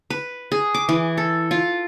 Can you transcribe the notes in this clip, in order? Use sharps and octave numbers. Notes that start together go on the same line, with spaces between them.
B4
G#4
D6
E3
A4
F4